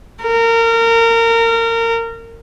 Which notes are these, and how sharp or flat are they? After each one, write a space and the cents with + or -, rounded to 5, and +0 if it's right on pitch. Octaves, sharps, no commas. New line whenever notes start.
A#4 -25